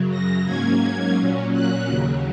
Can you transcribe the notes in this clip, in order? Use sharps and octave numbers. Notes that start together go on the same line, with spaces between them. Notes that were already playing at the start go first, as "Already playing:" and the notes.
Already playing: F#2 C#3 F#3
A#6
G#2 F#3 A#3 C#4 G#6
A#2 F#3 C#4
F#6
D#2 C#3 F#3